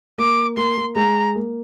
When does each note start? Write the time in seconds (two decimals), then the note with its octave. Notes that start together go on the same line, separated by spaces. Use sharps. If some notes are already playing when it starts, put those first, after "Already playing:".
0.18 A#3 D6
0.57 A#3 C6
0.77 A#3
0.96 G#3 A#5
1.35 A#3